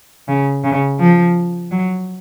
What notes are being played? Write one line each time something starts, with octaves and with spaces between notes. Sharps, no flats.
C#3
C#3
F3
F#3